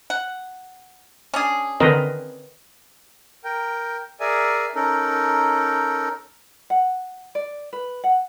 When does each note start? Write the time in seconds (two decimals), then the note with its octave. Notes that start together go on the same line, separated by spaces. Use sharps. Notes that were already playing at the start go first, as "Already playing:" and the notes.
0.10 F#5
1.34 C#4 D4 G#4
1.80 D3 D#3 C4 A#4 B4 D#5
3.44 A#4 G5
4.20 G#4 A#4 D5 E5 G#5
4.75 C#4 D#4 A4 A#4
6.70 F#5
7.35 D5
7.73 B4
8.04 F#5